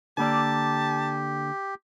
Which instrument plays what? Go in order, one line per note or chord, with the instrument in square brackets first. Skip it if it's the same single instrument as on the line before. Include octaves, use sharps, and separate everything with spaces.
[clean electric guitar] D3 A#3 D5 [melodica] G4 [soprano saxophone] A5